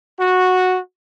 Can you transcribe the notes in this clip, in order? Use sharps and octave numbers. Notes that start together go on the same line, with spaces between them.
F#4